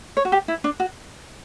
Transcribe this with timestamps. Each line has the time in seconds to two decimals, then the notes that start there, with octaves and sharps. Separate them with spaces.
0.17 C#5
0.25 F#4
0.32 G4
0.48 E4
0.64 D4
0.80 F#4